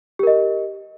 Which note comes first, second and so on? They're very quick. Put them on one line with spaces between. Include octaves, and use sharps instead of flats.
G4 A#4 D#5